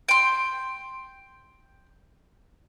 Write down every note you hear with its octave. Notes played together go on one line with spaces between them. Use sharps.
G5 C6